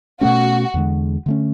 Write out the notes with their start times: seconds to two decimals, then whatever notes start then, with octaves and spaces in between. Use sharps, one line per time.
0.21 B2 A3 C#4 F#4
0.74 E2 D3 G#3
1.26 D3 A3 C#4